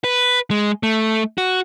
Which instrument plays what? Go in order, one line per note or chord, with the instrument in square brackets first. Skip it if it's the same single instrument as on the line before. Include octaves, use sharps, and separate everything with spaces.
[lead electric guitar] B4
G#3
A3
F#4